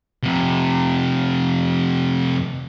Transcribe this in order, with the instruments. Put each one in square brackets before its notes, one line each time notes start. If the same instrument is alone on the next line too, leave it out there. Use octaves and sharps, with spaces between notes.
[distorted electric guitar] F2 C3